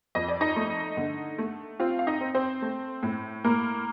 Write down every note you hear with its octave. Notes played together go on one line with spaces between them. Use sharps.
F2 D#5
D5
D#4 D#5
A3
D3
A3
C4 F4 F5
F5
D#4 D#5
C4
C4 C5
A3
A2
A2 A#3 A#4